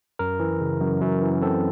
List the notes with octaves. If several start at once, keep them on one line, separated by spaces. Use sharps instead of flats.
F#2 A#4
E3
C#3
F#2
F#2
E3
C4 A4